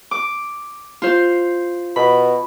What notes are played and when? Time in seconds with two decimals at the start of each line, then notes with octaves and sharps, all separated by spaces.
0.11 D6
1.02 F4 C5
1.96 B2 B5